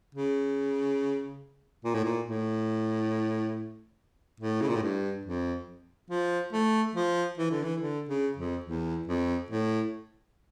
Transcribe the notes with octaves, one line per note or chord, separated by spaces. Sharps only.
C#3
A#2
A2
A#2
A2
A2
C#3
A#2
A2
G2
F2
F3
A3
F3
E3
D3
E3
D3
C#3
F2
E2
F2
A2